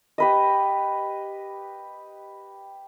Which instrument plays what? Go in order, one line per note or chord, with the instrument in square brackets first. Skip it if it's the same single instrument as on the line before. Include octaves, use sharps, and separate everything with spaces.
[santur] G4 B4 D#5